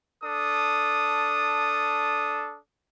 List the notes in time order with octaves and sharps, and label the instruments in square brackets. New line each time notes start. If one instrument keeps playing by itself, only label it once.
[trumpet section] D4 A4 D#6